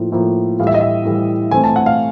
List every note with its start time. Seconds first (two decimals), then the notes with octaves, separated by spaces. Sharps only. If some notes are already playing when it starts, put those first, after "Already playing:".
Already playing: A2 F3 A#3
0.12 A2 F3 A#3
0.59 A2 E3 G3 F5
0.67 E5
0.74 D#5
0.81 E5
1.05 A2 E3 G3
1.51 E3 A3 C4 G#5
1.64 A5
1.76 F#5
1.86 F5